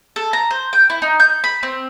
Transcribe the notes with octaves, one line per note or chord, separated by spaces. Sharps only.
A4
A#5
C5
G5
E4
D#4
G6
B5
C4